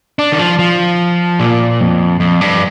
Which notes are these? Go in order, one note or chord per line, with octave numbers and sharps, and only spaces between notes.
D4
D#3
F3
F3
A#2
F2
F2
G2